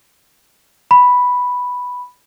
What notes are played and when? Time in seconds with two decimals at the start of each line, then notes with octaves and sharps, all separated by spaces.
0.91 B5